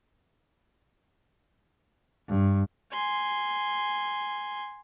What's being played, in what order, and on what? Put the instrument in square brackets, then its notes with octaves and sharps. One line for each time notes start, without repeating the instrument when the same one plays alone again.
[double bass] G2
[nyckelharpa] G#5 C6